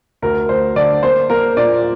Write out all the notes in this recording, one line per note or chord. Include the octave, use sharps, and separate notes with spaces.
D2 A#4
D2 C5
D3 D5
A#3 C5
A#3 A#4
A#2 D5